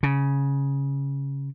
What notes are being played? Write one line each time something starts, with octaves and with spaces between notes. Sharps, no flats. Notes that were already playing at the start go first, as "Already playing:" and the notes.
C#3